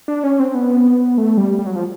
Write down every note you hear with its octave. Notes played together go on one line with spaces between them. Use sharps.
D4
C#4
C4
B3
A3
G3
G3
F#3
F3